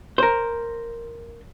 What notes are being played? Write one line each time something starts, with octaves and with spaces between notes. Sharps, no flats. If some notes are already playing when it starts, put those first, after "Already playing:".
A#4 C5